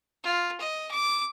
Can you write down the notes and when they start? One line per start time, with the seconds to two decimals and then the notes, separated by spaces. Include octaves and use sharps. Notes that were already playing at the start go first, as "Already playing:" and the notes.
0.24 F4
0.61 D#5
0.91 D6